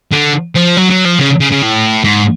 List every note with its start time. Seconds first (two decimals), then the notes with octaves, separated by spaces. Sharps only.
0.13 D3
0.55 F3
0.77 F#3
0.91 F#3
1.05 F3
1.19 C#3
1.40 C#3
1.51 C#3
1.62 A2
2.04 G#2